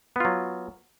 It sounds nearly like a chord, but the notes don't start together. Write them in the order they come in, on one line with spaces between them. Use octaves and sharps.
B3 F4 F#3